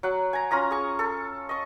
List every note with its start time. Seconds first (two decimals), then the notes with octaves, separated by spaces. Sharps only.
0.03 F#3 F#5
0.33 G#5 A#5
0.51 C#4 F4 A#5 D#6
0.71 G#4 C#6
0.99 A4
1.49 D#5 C#6